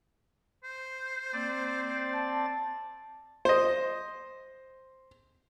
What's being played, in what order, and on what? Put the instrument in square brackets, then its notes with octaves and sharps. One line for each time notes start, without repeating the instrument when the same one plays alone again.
[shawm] C5
[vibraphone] A#3 [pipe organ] C4 D5 A6
[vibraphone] A5
[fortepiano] C5 D#5